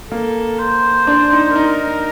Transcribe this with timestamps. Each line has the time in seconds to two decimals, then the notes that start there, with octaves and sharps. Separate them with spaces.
0.11 A#3 A4
0.59 C5
1.07 D4
1.32 D#4
1.56 D#4 A#4